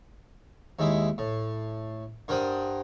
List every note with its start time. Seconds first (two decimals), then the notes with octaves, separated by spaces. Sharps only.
0.79 D#2 G#3 E4 E5
1.18 A2
2.28 G2 A#4 C5 F#5 G5 D#6